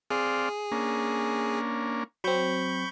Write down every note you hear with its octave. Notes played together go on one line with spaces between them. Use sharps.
C4 G#4 D5 F5
A#3 C#4 D4
F#3 C4 B5 C#6 G6